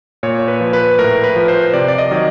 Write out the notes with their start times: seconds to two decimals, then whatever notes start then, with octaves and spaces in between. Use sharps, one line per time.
0.23 A#2 C#5
0.48 B4
0.61 F3
0.73 B4
0.99 A2 A#4
1.24 B4
1.36 F3
1.48 C5
1.73 C3 D5
1.88 D5
1.98 D#5
2.11 D#3 F#3